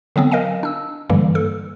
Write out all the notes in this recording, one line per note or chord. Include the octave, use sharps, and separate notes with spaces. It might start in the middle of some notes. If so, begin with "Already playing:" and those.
D3 F#3 B3 C4
A#4 D#5 F5 G#5
D4 E6
G2 D3 E3 G3 A#3
A4